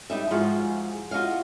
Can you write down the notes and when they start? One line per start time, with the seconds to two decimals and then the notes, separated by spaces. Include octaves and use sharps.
0.10 G3 D#4 E5
0.30 G#2 F3 F4 F#4 G#4
1.11 F4 F#4 D#5 F5